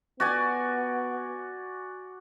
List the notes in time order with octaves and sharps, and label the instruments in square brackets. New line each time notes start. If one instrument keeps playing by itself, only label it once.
[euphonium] B3 [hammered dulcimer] F#4 D5 G#5